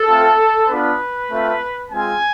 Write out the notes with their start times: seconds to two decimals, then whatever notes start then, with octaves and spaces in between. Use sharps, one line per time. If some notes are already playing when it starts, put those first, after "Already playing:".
Already playing: A4
0.08 A3 C4 F4
0.68 B3 D4 F4 B4
1.29 A3 C4 F4
1.90 G#3 C4 F4 G#5